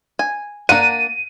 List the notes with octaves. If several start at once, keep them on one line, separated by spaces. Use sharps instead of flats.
G#5
A#3 D4 F#5 D#7